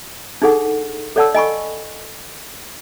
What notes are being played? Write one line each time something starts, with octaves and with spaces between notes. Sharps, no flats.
D4 D#4 G#4 A4 F#5
A4 C#5 D5 F#5 A5 E6
D#5 G#5 B5 C#6